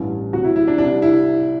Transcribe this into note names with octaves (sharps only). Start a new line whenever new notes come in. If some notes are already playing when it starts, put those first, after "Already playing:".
Already playing: A1 G2 E3
D2 C3 F#3 F#4
E4
E4
D4
C2 C3 G3 D4
E4